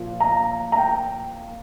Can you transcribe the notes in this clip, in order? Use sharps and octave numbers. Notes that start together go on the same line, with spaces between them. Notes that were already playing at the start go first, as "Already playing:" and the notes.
Already playing: A#2 F3 A#3
A#5
A#5
G5